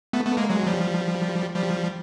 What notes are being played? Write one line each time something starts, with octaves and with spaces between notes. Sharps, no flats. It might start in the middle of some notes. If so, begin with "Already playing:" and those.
A3 B3
A3 B3
G#3 A#3
F#3 G#3
F3 G3
F3 G3